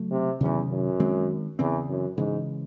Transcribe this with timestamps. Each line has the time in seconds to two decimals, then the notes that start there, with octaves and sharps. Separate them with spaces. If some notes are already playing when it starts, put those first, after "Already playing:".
Already playing: C#3 F#3 A3
0.11 C3
0.40 E2 C3 D#3 F#3 C#4
0.71 F#2
1.00 D#3 G#3 C4
1.59 E2 C#3 E3 C4
1.89 F#2
2.17 G#2 C#3 E3 G#3